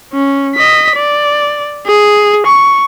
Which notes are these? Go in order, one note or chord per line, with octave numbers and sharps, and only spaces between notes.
C#4
D#5 B6
D5
G#4
C#6